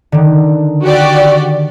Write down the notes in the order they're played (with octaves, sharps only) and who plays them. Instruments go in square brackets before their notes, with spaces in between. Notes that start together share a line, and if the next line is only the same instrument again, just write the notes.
[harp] D3 D#3
[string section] F#4 G4 D5